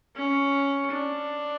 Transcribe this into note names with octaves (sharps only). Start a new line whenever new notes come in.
C#4
D4